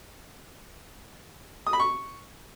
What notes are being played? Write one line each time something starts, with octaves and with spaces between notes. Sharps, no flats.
D#6
B5
C#6